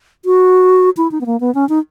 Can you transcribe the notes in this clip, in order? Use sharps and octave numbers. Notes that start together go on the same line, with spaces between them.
F#4
E4
D#4
B3
A#3
B3
C#4
D#4